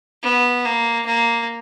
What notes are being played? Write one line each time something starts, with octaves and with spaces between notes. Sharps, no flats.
B3
A#3
A#3